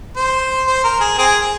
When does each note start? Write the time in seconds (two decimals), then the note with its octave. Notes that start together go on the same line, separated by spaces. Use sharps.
0.16 C5
0.67 C5
0.84 A#4
1.01 G#4
1.18 C4 G#4